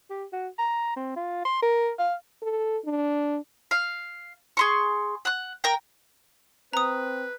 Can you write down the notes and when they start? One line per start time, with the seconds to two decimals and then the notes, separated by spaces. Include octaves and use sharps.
0.10 G4
0.33 F#4
0.58 A#5
0.96 C4
1.16 F4
1.45 C6
1.62 A#4
1.99 F5
2.42 A4
2.85 D4
3.71 F5
4.57 G#4 C6 C#6
5.25 F#5 F#6
5.64 A#4 G5
6.73 C4 B4 A#5 D#6